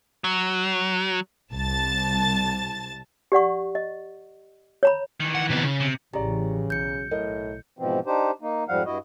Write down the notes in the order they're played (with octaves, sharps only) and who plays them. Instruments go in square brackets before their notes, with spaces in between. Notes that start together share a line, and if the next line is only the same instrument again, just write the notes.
[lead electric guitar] F#3
[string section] C2 A5 A6
[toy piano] G4 D5 F#5 C#6
D#5
C#5 A#5 B5
[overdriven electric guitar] D#3 E3
[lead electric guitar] F#5
C3 B3
C#3
[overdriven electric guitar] C3
[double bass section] A1 E3 [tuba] C#3 [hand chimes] G4 [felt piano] D5 A#5
[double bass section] B1 [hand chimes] G6 C#7
[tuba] A2 [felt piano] A#4 D#5
[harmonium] G#2 B2 E3 F3 C4
D4 D#4 G4 C5
A#3 D#4
F2 G#2 F3 G3 F5 F#5
G2 E4 F#4 D#5